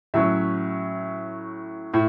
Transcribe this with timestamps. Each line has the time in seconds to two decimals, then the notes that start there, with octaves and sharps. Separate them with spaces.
0.14 A2 F#3 C#4 E5
1.94 A2